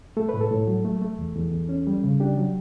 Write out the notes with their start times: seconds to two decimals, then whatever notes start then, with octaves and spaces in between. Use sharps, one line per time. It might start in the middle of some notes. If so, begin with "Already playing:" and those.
0.17 A3 A4
0.29 A2 B4
0.41 A4
0.51 A2
0.67 F#3
0.85 A3
1.01 A3
1.19 E2
1.36 E2
1.52 E2
1.69 C#4
1.87 G3
2.04 C#3
2.20 D4 G4
2.37 F#3